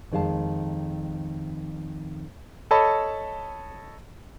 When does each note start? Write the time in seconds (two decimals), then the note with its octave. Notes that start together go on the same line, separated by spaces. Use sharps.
0.12 F2 D#3 G#3 F5 A5
2.71 A4 C#5 D#5 A5 B5